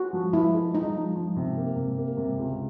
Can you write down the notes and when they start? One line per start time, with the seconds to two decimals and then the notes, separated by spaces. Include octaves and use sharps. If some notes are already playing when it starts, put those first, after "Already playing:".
Already playing: F#4
0.13 F3
0.33 F3 E4
0.54 G#3
0.74 F3 D#4
0.95 F3
1.16 F3
1.37 C3
1.57 A#3
1.76 C3
1.98 A#3
2.17 C3
2.38 C#2